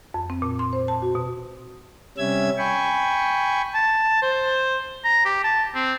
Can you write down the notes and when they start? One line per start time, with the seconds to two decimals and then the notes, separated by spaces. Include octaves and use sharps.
0.14 F2
0.30 C4
0.42 A#2
0.59 C6
0.73 C5
0.88 A5
1.02 F#4
1.15 B2
2.18 C3 G3 C#4 E5 E6 G#6
2.58 G5 G#5 B5 C#6
3.75 A5
4.22 C5
5.04 A#5
5.25 G4
5.44 A5
5.75 C4